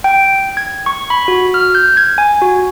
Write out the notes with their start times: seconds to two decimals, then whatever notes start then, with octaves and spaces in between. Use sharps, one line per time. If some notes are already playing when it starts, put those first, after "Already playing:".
0.04 G5
0.57 G#6
0.86 C#6
1.10 B5
1.28 F#4
1.54 F6
1.75 G6
1.97 G#6
2.18 G#5
2.42 F#4